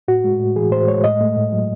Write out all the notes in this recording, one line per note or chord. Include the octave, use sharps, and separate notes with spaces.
A2 F#4
G#3
A2
E3 G#4
A2 C5
G#3 C#5
A2 D#5
A3
A2
F#3